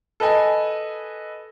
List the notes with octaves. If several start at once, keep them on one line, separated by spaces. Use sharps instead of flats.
A4 B4 D#5 G#5